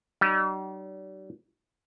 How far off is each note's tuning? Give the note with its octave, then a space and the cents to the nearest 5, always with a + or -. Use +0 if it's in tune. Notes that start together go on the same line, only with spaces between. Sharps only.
G3 -45 D#4 -45